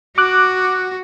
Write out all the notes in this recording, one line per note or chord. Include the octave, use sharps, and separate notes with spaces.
F#4 D6 F#6